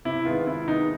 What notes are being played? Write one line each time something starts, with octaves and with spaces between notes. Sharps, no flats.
C3 E4
D#3 G#3 B3 F4
C3 E4
D#3 G#3 B3 D#4